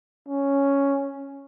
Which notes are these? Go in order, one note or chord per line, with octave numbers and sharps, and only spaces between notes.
C#4